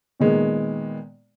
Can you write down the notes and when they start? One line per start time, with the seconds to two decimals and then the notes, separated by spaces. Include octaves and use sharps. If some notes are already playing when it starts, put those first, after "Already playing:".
0.20 A#2 D#3 G#3 B3